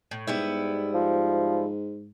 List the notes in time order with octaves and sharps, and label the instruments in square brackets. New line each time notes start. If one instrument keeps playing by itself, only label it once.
[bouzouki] A2
[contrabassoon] G#2 [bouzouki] G3 B3 E4
[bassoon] F3